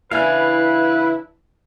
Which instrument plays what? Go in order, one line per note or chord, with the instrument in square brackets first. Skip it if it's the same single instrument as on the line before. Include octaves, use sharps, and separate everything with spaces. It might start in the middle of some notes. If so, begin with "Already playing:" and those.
[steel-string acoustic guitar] C#3 E3 D4 [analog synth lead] E4 [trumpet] B4 [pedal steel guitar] F5 G#5